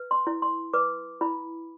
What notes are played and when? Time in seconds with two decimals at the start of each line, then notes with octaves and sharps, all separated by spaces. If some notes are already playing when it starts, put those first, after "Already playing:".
Already playing: B4
0.11 C6
0.27 E4
0.42 C6
0.74 B4 D6
1.21 E4 B5